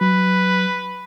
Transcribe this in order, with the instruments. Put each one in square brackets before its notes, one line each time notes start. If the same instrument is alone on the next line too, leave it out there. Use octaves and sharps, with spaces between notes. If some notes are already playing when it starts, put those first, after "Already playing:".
[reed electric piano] F#3 [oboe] B4